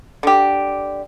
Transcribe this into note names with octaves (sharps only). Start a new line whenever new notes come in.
D3 G4